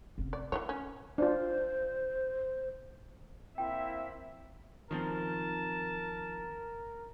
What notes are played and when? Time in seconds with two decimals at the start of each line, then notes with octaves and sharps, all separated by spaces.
0.18 F1 C#4
0.33 D5
0.52 E3 G#3 A3 C#5
0.69 C#4
1.18 D4 F4 C5
3.58 A#3 C4 E4 E5 G5
4.91 D#3 F3 C4 A#4 A5